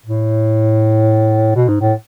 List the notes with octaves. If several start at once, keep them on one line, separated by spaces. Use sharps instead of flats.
A2
B2
G#2
A2